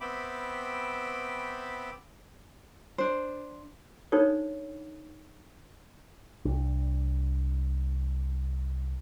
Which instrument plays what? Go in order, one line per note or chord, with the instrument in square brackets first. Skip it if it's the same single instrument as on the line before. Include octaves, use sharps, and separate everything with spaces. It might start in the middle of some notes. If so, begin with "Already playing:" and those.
[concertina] B3 C4 E5 G5 B5 D6
[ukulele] D4 C5
[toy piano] D4 D#4 A4 C5 C#5
[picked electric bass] C2 D4